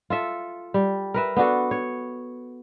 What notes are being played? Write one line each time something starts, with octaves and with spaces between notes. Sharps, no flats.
F4 A4 E5
G3
A#4 B4 E5
B3 D4 F#4 A4
C#5